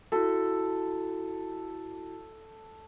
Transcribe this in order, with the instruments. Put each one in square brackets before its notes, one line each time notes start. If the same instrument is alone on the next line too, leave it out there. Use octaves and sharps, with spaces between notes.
[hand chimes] E4 F#4 [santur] A4